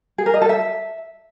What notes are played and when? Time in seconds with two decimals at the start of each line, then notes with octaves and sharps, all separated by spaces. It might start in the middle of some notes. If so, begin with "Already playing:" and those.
0.18 G#4
0.26 A#4
0.34 D#5
0.42 A4
0.49 E5